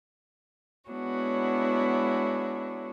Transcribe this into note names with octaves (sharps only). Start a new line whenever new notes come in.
G#3 B3 D4 E4 F#4 C#5